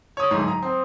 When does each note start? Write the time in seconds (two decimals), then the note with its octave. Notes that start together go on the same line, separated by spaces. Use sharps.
0.17 C#5 D#6
0.31 D1 G#2
0.48 A#5
0.62 C4